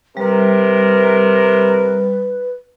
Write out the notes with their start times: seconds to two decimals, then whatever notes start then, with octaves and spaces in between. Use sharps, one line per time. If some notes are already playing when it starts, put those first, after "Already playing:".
0.17 C3 G3 A#4 B4